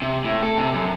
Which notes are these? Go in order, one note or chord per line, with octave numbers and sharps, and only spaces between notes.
C3
A2
A4
C3
F#2